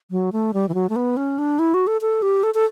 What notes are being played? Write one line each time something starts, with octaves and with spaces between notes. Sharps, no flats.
F#3
A3
G3
E3
F#3
A3
B3
C#4
D4
E4
F#4
A4
A4
G4
A4
A4